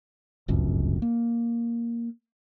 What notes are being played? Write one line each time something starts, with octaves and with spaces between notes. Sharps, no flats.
D1 G1 C#2 F#2
A#3